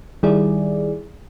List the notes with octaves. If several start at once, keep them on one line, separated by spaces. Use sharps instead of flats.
D#3 G3 E4 G#4 D5